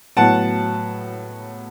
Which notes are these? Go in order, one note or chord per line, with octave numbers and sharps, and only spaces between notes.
A2 F#3 B3 F#5 A5